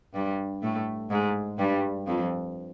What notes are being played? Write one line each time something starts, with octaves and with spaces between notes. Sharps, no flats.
G2 G3
A2 A3
G#2 G#3
G2 G3
F2 F3